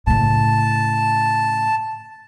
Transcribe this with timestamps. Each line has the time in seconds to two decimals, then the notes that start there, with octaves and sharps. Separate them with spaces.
0.07 A2 C#3 A5